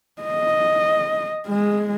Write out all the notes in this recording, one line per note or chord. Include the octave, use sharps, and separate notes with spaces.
D#5
G#3